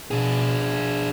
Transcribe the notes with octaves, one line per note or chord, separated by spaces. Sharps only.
B2 D4 G#4